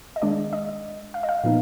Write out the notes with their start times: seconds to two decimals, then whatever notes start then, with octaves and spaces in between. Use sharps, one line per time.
0.16 D#5
0.22 D#3 G#3 D4 D5
0.53 D#5
1.14 F5
1.23 D#5
1.29 F5
1.44 A#2 F3 B3 D#4